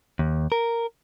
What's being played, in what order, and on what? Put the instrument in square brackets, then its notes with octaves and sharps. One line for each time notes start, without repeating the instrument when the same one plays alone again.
[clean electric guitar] D#2
A#4